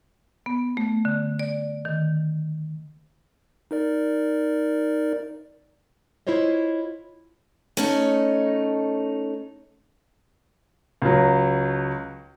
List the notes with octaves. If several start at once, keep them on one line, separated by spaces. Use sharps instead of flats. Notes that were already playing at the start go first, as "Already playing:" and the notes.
B3
A3
D3
D5
D#3
D#4 A#4 D5
E4 F4 C5 C#5 D#5
A3 C#4 D#4
C#2 F#3